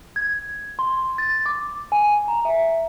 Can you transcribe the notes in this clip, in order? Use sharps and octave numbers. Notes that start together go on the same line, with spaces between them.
G#6
C6
A6
D6
G#5
A#5
E5